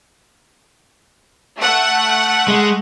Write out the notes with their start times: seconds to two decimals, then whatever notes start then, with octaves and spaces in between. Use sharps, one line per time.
1.58 A3 F#5
2.48 G#3